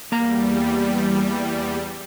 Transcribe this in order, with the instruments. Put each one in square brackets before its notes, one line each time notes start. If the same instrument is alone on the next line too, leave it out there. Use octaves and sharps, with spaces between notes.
[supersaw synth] E2 G3 [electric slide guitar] A#3 A#5